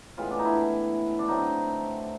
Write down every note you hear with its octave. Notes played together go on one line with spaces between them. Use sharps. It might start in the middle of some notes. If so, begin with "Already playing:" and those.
A2 E3 G#3 B3 F4
D4
D#4
E4
D4
D3 F#3 A3 C4 D#4